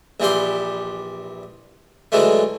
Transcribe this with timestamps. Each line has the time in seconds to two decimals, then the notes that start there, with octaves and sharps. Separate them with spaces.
0.20 A#1 E3 G3 G4 C6
2.12 D3 E3 F#3 G#3 A3